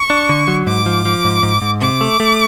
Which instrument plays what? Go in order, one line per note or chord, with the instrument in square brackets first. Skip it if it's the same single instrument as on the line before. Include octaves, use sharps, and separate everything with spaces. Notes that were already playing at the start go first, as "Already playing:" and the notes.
Already playing: [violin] C#6
[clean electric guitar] D4
D3
F#3
[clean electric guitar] G#2 [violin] D6
[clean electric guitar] F3
F3
G#2
G#2
G#2
[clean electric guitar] C3 [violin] D6
[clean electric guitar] A3
A3